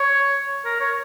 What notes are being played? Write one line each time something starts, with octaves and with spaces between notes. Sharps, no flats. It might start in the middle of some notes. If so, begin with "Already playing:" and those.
Already playing: C#5
A#4
C#5